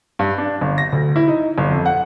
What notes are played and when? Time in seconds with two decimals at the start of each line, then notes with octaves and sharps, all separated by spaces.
0.19 G2
0.38 D4
0.61 G1
0.78 A#6
0.92 D2
1.16 E4
1.28 D#4
1.58 G1
1.70 F2
1.86 F#5